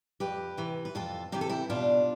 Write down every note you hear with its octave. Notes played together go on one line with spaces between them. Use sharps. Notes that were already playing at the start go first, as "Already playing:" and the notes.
F2 G4 B4
C3 E3
B4
F2 F4 A4
C3 E3 G4
A4
E4 G4
B2 D4 F4